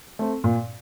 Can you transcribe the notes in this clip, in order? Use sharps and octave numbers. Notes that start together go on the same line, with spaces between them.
A3 C4
A#2